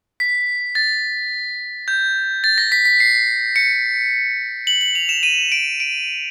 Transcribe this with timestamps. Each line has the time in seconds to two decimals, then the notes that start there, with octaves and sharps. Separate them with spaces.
0.20 B6
0.75 A6
1.88 G6
2.44 A6
2.58 A#6
2.72 B6
2.85 B6
3.00 C7
3.56 C#7
4.67 F#7
4.81 F#7
4.95 F7
5.09 E7
5.23 D#7
5.52 D7
5.80 D7